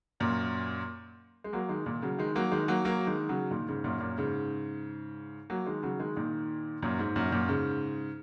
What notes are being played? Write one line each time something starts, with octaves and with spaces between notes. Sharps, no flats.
F#2 A#2
G#3
F#3 A#3
D#3 G#3
A#2 D#3
C#3 F#3
D#3 G#3
F#3 A#3
D#3 G#3
F#3 A#3
F#3 A#3
D#3 G#3
C#3 F#3
A#2 D#3
G#2 C#3
F#2 A#2
F#2 A#2
G#2 C#3
F#3 A#3
D#3 G#3
C#3 F#3
D#3 G#3
A#2 D#3
F#2 A#2
G#2
F#2 A#2
F#2 A#2
G#2 C#3